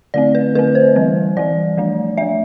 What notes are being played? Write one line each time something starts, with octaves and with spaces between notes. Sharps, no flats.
D3 A3 C4 D5
B4
D3 A3 C4 B4
C5
E3 G3 C4
E3 G3 C4 D5
F3 A3 D4
F3 A3 D4 E5